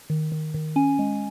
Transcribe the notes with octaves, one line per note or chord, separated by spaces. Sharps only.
D#3
D#3
D#3
C#4 G#5
G#3